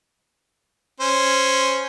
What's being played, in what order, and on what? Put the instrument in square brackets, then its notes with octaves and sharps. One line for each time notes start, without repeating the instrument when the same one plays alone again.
[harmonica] C#4 C5